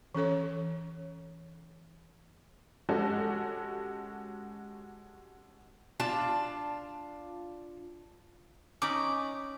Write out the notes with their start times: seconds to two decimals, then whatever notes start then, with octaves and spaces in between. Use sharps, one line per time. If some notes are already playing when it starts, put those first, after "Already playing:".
0.15 E3 C#4 A4 C#5
2.89 G#3 C#4 F#4 G4 A4
6.00 D4 F4 A5
8.82 C#4 D#4 B5 D6